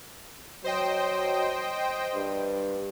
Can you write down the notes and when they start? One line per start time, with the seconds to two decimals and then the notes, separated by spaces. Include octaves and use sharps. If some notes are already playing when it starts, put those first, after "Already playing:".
0.64 F#3 C5 D#5 G5
2.15 G2